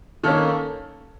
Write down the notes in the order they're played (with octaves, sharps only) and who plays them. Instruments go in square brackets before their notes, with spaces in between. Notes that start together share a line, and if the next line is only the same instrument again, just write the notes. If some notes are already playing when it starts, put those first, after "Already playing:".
[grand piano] D#3 A#3 C#4 A4